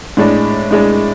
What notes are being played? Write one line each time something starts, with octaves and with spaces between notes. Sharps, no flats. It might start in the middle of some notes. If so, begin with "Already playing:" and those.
A2 G#3 D4
A2 G#3 D4